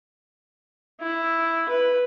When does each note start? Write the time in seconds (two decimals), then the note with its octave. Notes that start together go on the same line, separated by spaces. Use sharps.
1.01 E4
1.68 B4